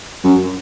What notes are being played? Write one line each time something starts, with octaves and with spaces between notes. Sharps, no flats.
F#2